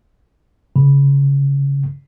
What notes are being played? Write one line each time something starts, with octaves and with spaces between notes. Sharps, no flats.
C#3